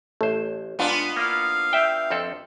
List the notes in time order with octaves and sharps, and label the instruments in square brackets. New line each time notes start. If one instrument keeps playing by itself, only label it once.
[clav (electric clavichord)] A1 C5 [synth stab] A3
[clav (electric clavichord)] G#2 [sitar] B3 D4 F4
[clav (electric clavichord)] A#3 E4 [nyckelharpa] F5
[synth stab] E5 G5
[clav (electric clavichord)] F2 C4 A4